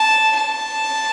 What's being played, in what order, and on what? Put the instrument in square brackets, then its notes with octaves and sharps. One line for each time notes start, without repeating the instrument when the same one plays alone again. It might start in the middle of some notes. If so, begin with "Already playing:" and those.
Already playing: [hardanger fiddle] A5
A5